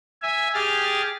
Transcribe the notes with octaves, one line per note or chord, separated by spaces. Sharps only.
E5 G#5
G4 G#4 F6 A6